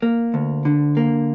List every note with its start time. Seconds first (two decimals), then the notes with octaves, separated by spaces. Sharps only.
0.02 A#3
0.34 D2
0.65 D3
0.97 A#3